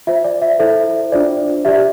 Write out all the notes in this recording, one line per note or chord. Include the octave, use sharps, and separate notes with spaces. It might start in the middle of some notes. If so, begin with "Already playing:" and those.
F4 C5 E5
D5
E5
E4 A4 C5 E5
D4 F4 C5 D5
G4 D5 E5